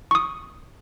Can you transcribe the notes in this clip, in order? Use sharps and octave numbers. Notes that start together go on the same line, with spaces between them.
C#6 D#6